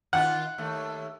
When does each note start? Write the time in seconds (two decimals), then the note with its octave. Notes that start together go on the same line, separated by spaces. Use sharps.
0.13 D#3 F4 F#5
0.58 D#2 A3